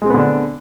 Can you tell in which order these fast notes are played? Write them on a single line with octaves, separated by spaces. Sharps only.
G#3 C4 B3 D3 D4